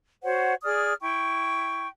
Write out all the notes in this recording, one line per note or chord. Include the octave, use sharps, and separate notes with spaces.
F#4 C5 C#5 F#5
G#4 D5 D#6 F6
E4 G5 C#6